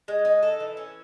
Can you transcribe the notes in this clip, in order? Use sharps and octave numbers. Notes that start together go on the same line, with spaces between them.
G#3
D#4
A4
E3
C#4